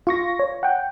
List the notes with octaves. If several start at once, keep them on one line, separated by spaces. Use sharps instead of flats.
F4 C#6 A#6
C#5
F#5 G5